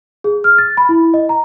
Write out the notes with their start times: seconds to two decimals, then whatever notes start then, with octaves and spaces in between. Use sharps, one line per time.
0.24 G#4
0.44 F6
0.58 A6
0.77 B5
0.89 E4
1.14 D#5
1.29 A#5